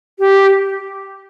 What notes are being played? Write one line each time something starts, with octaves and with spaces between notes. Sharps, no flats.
G4